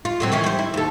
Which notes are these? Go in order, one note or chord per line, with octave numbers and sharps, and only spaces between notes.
F4
A2 F#3 C4
D#3 E3 C#4
G3 C5
E4
D#2 A4